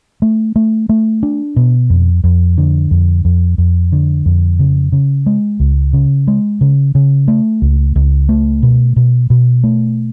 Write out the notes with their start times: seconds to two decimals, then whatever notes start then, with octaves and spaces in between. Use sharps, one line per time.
0.22 A3
0.56 A3
0.89 A3
1.23 D4
1.56 B2
1.90 F2
2.24 F2
2.58 D3
2.91 F2
3.25 F2
3.58 F2
3.92 D3
4.26 F2
4.59 C#3
4.92 C#3
5.26 G#3
5.60 C#2
5.93 C#3
6.28 G#3
6.61 C#3
6.95 C#3
7.28 A3
7.62 C#2
7.96 C#2
8.29 A3
8.63 B2
8.96 B2
9.30 B2
9.63 A3